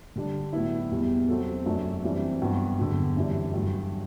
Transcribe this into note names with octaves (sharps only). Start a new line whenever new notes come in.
D3 G3 D4
A2 F#3 B3 E4
E2 B2 G3
C3 F#3 C4 F#4 A4
F#2 F#3 A3 D4
C3 E3 G3 D4
G2 F#3 B3 F#4
E2 D3 F#3
F#2 E3 G3 D4
G2 F#3 A3